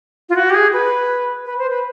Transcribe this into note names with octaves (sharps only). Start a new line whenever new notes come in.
F4
F#4
G4
G#4
B4
B4
C5
B4